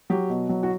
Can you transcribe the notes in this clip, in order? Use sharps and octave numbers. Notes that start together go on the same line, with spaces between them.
F#3 G4
B2
F#3
F#4